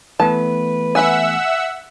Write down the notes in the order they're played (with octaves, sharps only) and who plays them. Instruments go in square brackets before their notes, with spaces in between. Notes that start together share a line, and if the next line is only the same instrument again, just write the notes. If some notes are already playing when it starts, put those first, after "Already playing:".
[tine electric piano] E3 A3 B3 [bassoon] B4 [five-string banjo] A5
[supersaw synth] E5 F#5 E6 [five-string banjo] G#5 B5